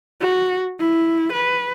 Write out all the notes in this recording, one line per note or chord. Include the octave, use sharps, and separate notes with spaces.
F#4
E4
B4